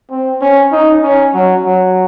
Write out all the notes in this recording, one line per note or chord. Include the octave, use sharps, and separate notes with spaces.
C4
C#4
D#4
C#4
F#3
F#3